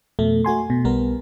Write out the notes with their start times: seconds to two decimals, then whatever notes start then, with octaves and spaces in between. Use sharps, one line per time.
0.19 F2 B2 A3
0.45 A3 F#4 G#5 C6
0.70 B2
0.84 B1 G3 B3 A#4